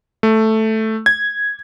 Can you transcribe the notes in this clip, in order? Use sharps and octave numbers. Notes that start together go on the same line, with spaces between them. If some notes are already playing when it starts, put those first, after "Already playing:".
A3
G#6